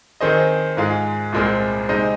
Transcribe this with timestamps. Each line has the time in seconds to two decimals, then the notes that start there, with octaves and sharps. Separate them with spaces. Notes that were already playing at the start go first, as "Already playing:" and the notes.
0.21 D#3 C4 G#4 C5 D#5
0.77 G#2 G#3 F4 G#4
1.33 C2 A#2 G#3 C4 G#4
1.89 C3 G#3 D#4 C5 D#5